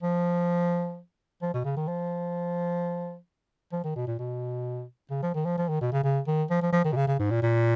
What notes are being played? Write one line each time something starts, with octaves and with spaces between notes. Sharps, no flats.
F3
F3
B2
C#3
D#3
F3
F3
D#3
B2
A#2
B2
C#3
F3
D#3
F3
F3
D#3
B2
C#3
C#3
D#3
F3
F3
F3
D#3
B2
C#3
C#3
G#2
A#2
A#2